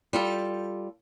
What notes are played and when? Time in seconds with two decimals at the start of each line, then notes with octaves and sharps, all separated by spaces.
0.13 G3 F4 A4